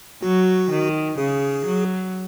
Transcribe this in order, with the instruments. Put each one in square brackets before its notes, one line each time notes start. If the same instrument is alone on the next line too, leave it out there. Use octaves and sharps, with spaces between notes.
[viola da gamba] F#3 [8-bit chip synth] F#4
[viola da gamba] D#3
[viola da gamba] C#3 [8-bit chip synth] G#4
[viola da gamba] F#3